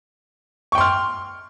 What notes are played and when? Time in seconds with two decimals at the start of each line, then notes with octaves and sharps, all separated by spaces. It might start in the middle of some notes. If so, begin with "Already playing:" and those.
0.72 C#6
0.75 G5
0.78 C6
0.81 F6